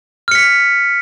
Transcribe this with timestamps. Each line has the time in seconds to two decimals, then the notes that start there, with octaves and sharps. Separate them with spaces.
0.28 F6
0.31 C#7
0.35 B6